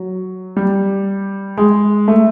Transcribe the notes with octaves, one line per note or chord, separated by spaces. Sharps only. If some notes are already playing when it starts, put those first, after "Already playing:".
Already playing: F#3
G3
G#3
A3